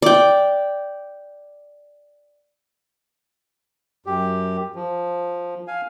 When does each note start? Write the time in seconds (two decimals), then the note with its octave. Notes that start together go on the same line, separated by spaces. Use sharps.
0.02 D5 G5
4.06 F#2 G4
4.75 F3
5.67 F5 G#5